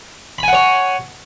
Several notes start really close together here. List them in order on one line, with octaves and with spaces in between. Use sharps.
B5 G#5 F#5 C#5